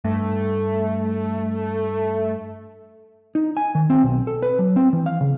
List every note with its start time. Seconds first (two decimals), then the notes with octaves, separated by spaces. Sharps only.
0.04 G2 A3
3.35 D#4
3.57 G#5
3.75 D#3
3.90 C4
4.03 B1
4.27 A4
4.42 B4
4.59 F#3
4.76 C4
4.93 E3
5.06 F5
5.21 C#3